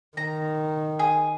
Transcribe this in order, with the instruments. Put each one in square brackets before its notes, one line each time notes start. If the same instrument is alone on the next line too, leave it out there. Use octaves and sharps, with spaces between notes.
[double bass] D#3 [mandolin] A#5
[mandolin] G#4